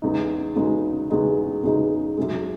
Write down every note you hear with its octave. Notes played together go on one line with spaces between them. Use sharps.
E2 C#3 G#3 D#4
E2 C#3 G#3 D#4
E2 C#3 G#3 D#4
E2 C#3 G#3 D#4
F#2 C#3 G#3